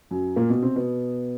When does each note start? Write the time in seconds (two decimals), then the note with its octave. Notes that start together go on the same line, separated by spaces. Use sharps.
0.11 F#2 F#3
0.36 A#2 A#3
0.50 B2 B3
0.62 C3 C4
0.76 B2 B3